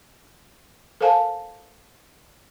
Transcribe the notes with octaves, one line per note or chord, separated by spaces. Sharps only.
A4 A#4 C5 F5 G#5 A5